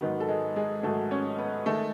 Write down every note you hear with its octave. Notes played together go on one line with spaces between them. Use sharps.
G#2 D#3 F#3 B3 B4
A4
G#3 G#4
G#3 G#4
G#2 D#3 F#3 A3 A4
C#4 C#5
B3 B4
D#3 G#3 A3 A4